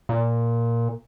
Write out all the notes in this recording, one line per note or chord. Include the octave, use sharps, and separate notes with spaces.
A#2